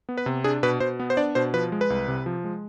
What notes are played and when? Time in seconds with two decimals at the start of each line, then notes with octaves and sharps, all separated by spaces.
0.09 B3
0.18 B4
0.26 C3
0.44 D4 G#4
0.63 B2 B4
0.80 B2 C5
1.00 B3
1.10 C5
1.17 D4 D5
1.35 B2 C5
1.54 F3 B4
1.72 G#3
1.81 B4
1.90 C2
2.08 C3
2.26 F3
2.44 G#3